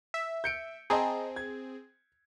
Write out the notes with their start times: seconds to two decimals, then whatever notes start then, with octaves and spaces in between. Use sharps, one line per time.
0.14 E5
0.44 G6 C#7 D7
0.90 C4 G#4 D#5 A5 A#5
1.36 G#6